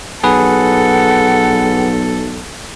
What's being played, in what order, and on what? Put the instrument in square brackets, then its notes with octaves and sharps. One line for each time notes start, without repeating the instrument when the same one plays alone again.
[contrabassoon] B1 [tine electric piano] G#4 B4 [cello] A4 [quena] F#5